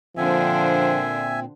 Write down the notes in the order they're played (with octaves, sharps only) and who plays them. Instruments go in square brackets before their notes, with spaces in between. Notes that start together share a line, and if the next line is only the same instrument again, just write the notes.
[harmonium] A#2 C4 [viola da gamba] D3 D4 C5 [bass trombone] F3 [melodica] E5 G#5